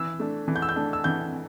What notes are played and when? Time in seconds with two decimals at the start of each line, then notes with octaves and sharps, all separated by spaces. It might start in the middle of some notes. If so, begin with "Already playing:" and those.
Already playing: E3 E6
0.20 A3 D4
0.48 E3
0.56 G6
0.62 E6
0.69 G6
0.76 A3 D4
0.93 E6
1.04 E3 G6